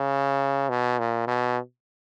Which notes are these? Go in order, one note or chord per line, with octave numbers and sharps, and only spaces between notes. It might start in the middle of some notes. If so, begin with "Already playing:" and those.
Already playing: C#3
B2
A#2
B2